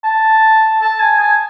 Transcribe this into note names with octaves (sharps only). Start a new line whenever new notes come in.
A5
A5
G#5
G#5